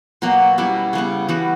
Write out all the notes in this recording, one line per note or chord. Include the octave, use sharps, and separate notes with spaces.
B2 F#3 A#3
B2 G3 C#4 E4
C#3 G3 B3
E3 G3 B3 F#4